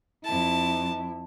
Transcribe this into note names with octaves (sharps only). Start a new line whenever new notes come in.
F2 E4 A5